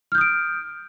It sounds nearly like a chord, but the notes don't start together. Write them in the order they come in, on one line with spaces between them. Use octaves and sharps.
F6 G6 D#6 D7